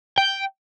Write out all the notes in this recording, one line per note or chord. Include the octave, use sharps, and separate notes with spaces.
G5